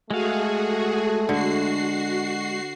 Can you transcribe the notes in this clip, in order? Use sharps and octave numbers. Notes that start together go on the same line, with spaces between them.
G#3 A3 F#4 G#4 A4 F5
D3 F#4 C7